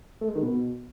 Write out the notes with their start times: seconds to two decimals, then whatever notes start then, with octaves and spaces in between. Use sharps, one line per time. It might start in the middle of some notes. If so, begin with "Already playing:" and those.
0.21 A3
0.28 G#3
0.35 D#3
0.43 B2